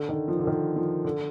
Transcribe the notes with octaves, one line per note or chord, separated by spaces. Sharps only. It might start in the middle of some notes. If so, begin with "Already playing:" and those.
Already playing: D3
D#3
F3
D3
D#3
F3
D3